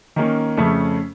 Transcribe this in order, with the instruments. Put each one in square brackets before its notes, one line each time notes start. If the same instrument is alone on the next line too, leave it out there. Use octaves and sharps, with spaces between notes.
[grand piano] D#3 A#3 C#4
F2 C#3 A3 C#4